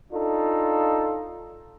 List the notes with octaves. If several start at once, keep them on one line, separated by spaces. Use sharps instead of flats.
D4 D#4 F4 A4